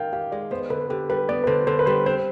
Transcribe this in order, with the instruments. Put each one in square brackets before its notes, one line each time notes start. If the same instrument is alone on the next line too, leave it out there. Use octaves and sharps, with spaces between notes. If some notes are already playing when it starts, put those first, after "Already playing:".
Already playing: [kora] D#3 [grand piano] F5 G5
[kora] G4 [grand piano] F5
[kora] G#3 [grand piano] D5
[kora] B3 [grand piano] C5
[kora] D3 [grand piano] B4
[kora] D3 [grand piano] G4
[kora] G3 [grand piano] B4
[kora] B3 [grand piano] D5
[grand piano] B4
[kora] D3 [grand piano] C5
[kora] D3 [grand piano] C5
[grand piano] B4
[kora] G3 [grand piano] C5
[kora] C4 [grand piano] C5